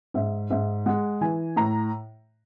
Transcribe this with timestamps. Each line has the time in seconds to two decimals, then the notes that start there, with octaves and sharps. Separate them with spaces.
0.14 G#2 E5
0.50 G#2 E5
0.86 G#3 F#5
1.21 E3 G#5
1.56 A2 A#5